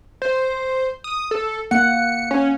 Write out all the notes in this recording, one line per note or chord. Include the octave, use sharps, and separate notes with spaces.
C5
D#6
A4
A#3 F#5 C#7
C#4